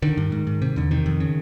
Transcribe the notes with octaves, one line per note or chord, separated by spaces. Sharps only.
D3 D#3
G2
G#2
G#2
C3
E2 D3
C3 D#3
F2
C#3